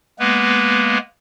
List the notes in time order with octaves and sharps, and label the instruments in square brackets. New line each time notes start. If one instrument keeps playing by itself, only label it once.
[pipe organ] G#3 A#3 B3 B4